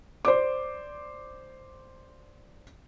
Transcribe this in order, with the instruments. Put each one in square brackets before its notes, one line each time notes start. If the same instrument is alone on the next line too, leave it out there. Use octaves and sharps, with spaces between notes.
[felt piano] C5 D5 D6